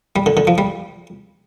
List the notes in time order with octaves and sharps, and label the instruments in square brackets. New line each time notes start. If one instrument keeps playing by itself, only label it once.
[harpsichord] G3
D3
D3
F3
G3